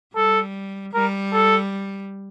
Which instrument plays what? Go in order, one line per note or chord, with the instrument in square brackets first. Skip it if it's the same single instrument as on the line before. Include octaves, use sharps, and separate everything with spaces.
[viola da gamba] G3 [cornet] A4
[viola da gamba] G3 [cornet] A#4
[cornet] A4